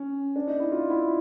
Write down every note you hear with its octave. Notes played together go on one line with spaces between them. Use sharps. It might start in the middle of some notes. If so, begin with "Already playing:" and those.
Already playing: C#4
D4
D#4
E4
F4
E4